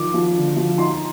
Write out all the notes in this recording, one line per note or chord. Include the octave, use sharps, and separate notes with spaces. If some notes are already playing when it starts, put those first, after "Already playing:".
Already playing: D#3 F3 D6
F3
D3
F3
D#4 C6